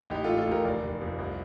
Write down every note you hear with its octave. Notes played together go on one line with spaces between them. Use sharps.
A1 D#4 G4
A2 F4 A4
F4 A4
A1 G4 A#4
F1 A#4 D5
F1
F2
C2